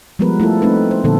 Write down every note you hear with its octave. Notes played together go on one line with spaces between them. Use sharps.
F3 G3 G#3 B3 A#4 B4
A3 E4 F4 A4
A3 C4 D#4 B4
C5
A#2 D3 F3 B3 A4